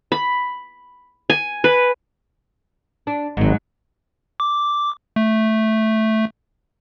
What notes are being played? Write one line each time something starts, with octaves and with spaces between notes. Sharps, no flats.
B5
G#5
B4
D4
G#1 G#2 F#3
D6
A3